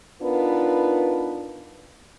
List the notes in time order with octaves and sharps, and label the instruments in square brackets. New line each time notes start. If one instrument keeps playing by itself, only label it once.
[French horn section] B3 D4 D#4 F4 A#4 B4